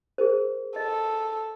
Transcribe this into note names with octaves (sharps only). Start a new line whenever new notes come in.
G#4 A#4 C5
A4 D#5